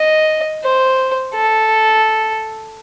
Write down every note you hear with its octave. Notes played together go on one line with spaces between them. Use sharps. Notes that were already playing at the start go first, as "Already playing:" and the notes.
Already playing: D#5
C5
A4